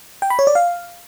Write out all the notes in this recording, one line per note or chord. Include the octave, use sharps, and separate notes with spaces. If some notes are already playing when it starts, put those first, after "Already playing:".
G5
B5
C#5
D5
F5